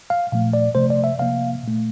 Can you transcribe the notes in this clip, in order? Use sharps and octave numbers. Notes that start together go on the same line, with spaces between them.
F5
A#2 F3 A3 F5
D5
C3 F3 A3 C5
D5
E5
C3 F3 A#3 F5
A#2 A3